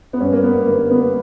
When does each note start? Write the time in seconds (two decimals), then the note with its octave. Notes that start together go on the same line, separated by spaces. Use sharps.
0.13 B3
0.20 G2 C#4
0.32 A#3
0.43 B3
0.67 D3 A#3
0.91 B3